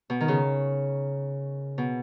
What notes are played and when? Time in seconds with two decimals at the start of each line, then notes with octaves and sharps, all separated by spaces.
0.10 B2
0.20 D#3
0.28 C#3
1.78 B2